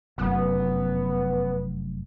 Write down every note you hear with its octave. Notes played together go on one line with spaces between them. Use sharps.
F1 F#2 B3